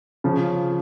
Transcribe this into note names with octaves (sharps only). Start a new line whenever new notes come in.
C#3 F3